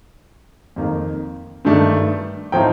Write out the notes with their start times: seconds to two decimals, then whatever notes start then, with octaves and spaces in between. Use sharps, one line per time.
0.76 F2 D#3 A#3
1.65 G2 D#3 A3 D4
2.52 A2 F3 C4 D#4 G5 A#5